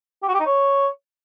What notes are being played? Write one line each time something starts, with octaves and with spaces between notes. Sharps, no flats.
G4
F#4
G4
D#4
C#5